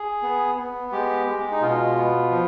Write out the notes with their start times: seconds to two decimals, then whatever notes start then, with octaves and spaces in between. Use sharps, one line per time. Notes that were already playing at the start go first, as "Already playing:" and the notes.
Already playing: G#4
0.22 B3
0.58 B3
0.92 G#3 G4
1.27 G#3
1.52 D#4
1.61 B2 F4
1.97 B3
2.31 F3